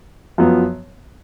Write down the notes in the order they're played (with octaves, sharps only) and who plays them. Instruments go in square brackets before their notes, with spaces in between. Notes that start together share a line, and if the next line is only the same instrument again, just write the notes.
[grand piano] F#2 F3 B3